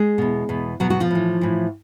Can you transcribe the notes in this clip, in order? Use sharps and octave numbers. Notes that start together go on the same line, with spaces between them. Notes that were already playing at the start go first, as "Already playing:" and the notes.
Already playing: G#3 G#4
E2 B2
E2 B2
E2 B2 F#3 F#4
F#3 F#4
F3 F4
A2 E3
A2 E3